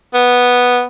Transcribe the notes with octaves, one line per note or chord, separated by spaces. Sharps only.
B3